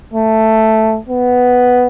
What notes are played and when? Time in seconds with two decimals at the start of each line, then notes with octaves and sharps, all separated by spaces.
0.13 A3
1.09 B3